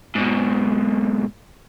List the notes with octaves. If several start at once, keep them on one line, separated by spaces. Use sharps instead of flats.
G#2 B2